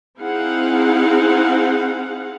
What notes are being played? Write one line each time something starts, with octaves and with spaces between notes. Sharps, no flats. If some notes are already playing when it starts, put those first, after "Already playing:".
C4 D#4 E4 G#4 F5 F#5